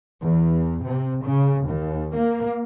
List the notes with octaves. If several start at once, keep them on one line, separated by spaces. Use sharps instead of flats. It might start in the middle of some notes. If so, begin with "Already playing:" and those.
E2
C3
C#3
D#2
A#3